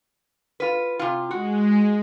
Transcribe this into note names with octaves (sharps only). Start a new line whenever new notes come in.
F4 B4
C3 F4
G#3 F#4